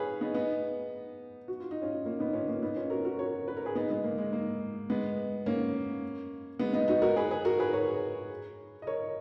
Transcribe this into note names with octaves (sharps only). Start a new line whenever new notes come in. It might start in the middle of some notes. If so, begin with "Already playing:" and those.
Already playing: G#4 B4 C#5 F5
B3 D#4
B3 D#4
F#4
F4
D#4
C#4 F4
A#3 C#4
B3 D#4
C#4 F4
A#3 C#4
B3 D#4
C#4 F4
F#4 A#4
F#4 A#4
A#4 C#5
B4
A#4
G#4 B4
B3 D#4
G#3 B3
A#3
G#3
A#3
G#3 B3
A#3 C#4
G#3 B3
B3 D#4
D#4 F#4
F#4 A#4
G#4 B4
G#4 B4
F#4 A#4
G#4 B4
A#4 C#5
D#5
A#4 C#5